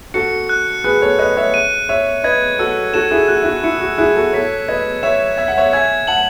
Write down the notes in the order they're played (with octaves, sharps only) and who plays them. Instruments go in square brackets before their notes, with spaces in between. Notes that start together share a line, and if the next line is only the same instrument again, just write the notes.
[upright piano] F#4 A4 [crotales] C#7
[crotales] F#6
[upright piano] G#4 B4 [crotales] F#6
[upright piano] A4 C#5
[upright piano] B4 D#5 [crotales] F#6
[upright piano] C#5 E5
[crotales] D#7
[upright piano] C#5 E5 [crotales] D#7
[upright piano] B4 D#5 [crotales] G#6
[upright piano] F#4 A4 [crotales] E6
[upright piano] F#4 A4 [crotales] E7
[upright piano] E4 G#4
[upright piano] F#4 [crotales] F#6
[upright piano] E4
F#4
[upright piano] E4 [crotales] C#7
[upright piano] F#4
[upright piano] E4 G#4 [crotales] F#6
[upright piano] F#4 A4
[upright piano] A4 C#5 [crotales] B6
[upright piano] B4 D#5 [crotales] G#6
[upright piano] C#5 E5 [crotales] E7
[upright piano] E5 [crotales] G#6
[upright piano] F#5
C#5 E5
[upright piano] E5 G#5 [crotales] G#6
[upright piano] F#5 A5 [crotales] F#7